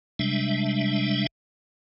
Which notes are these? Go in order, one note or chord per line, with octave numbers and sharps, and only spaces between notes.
C3 G3 G#3 D4 E5